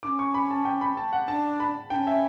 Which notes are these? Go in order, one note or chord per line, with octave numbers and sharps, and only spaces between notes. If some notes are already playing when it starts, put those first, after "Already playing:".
C#4 D4 D6
C#6
B5
A5
G5
B5
A5
F#5
D4 A5
B5
D4 G5
C#4
E5